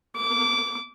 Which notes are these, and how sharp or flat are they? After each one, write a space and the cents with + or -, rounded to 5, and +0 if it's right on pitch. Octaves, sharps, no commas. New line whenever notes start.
D6 -20